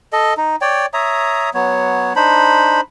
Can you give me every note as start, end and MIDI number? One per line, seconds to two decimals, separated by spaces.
0.13 0.34 69
0.13 0.34 75
0.37 0.56 63
0.61 0.86 73
0.61 0.86 74
0.61 0.86 79
0.94 1.50 73
0.94 1.50 76
0.94 1.50 82
0.94 1.50 87
1.54 2.13 54
1.54 2.13 59
1.54 2.13 73
2.16 2.81 62
2.16 2.81 63
2.16 2.81 72
2.16 2.81 83